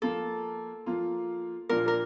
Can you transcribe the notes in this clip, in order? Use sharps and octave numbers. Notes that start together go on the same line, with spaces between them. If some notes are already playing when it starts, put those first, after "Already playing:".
F3 A#3 F4 A4
F3 A#3 F4
A#2 F3 A#3 D4 F4 A#4
A#4